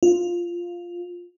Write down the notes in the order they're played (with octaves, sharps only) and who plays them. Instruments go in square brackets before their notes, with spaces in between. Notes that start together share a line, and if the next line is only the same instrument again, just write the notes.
[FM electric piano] F4